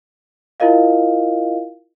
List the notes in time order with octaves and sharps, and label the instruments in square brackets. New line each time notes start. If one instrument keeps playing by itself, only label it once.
[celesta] E4 F4 A#4 D#5 F5